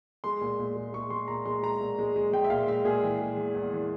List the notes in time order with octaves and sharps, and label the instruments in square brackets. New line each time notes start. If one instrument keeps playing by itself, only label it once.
[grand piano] G#3 C6
A#2
A#2
G#3
G#3 C#6
G#3 C6
A#2 A#5
G#3 C6
G#3 A#5
A#2
G#3
G#3
G#3 G5
E5
A#2 F5
G#3 E5
A#2 G#4
E3
G#3
E2
E2
E3